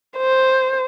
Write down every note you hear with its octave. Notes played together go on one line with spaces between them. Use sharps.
C5